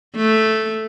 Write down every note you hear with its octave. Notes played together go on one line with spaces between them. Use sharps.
A3